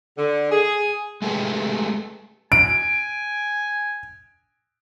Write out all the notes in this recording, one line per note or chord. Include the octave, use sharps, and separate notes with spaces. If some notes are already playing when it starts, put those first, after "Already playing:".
D3
G#4
G#3 A3 G4 G#4 B4
G#5 D7